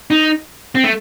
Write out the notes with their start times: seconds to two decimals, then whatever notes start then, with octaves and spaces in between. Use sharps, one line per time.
0.11 D#4
0.75 C4
0.84 A3